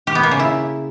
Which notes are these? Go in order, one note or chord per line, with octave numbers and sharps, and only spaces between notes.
G4
B3
A#3
C#3
E4